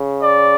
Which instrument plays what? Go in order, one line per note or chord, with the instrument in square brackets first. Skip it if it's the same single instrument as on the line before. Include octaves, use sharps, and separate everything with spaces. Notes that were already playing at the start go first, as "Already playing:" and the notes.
Already playing: [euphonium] C#3
[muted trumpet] D5